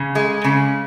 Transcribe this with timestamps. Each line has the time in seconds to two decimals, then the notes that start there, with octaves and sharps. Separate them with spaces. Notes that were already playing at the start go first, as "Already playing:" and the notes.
Already playing: C#3
0.15 G#3
0.44 C#3